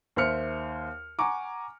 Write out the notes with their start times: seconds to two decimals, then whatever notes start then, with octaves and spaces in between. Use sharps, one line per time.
0.16 D#2 C5 E5 F6 C#7
1.19 F#5 G#5 A#5 C#6 D6